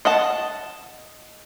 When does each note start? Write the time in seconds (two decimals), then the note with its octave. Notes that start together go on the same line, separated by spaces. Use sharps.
0.05 D#5 F#5 A5